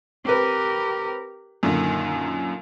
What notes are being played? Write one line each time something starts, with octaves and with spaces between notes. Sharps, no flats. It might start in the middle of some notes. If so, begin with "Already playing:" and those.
C4 G4 A#4 B4
F#2 A#2 D3 D#3